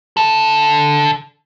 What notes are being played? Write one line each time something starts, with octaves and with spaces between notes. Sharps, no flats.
D3 A4